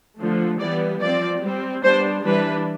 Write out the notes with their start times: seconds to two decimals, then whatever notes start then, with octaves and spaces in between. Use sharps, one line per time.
0.17 D3 F3 A3
0.59 E3 G3 B3 D5
1.00 F3 C4 D5
1.41 G3 C4
1.82 G3 B3 D4 C5
2.24 E3 G3 D4 B4